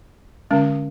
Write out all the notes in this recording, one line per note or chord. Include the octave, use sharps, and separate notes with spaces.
D3 G#3 C#4